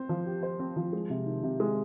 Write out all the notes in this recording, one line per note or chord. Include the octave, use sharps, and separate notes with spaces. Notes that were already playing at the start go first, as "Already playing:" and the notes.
Already playing: C4 C5
F3
G4
C5
C4
F3
G#3
C3
D#3
C3
G#3